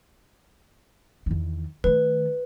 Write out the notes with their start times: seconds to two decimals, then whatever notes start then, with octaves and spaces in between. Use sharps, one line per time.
1.26 E2 D#3
1.84 D#3 A3 B4